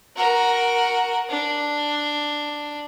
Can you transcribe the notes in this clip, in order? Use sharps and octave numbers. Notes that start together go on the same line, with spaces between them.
F#4 A#4
D4